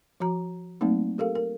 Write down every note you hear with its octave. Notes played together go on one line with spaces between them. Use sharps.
F3 F#4 A#5
F#3 A3 A#3 C4 D#4
G4 A4 A#4 F5
A#4